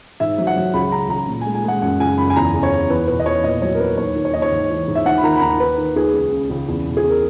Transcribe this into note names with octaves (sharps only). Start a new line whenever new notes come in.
G#2 E5
F#3
F#5
F#3
C#2 B5
C#3 A#5
C#2 A#5
A#2
G#5
G#3
G#5
G#3 F#5
F#2 F#5
C#3 G#5
F#2 B5
G#5
E2 A#5
C#3
C#5
E2
E2 B4
B2 B4
D#5
E2 C#5
A#2 D#5
F#3 C#5
A#4
F#3 B4
D#2 C#5
D#3
C#5
D#2 D#5
C#5
G#2
E3
G#2
E5
D#2 F#5
B5
D#3 A#5
B5
D#2 A#5
D#2 B4
D#3
D#2 G#4
C#2
C#3
C#2
E2
B2
G#4
E2
A#4